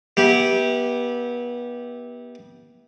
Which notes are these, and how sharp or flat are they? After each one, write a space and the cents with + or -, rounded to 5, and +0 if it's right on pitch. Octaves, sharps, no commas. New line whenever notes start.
B3 -30 E4 -30 G4 +0